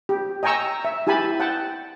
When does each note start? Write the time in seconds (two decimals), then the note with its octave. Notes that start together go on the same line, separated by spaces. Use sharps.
0.09 G4
0.43 D#5 G5 G#5 A#5 C#6 E6
0.85 E5
1.07 E4 G4 G#5 A5 B5
1.40 F#5 G5 A5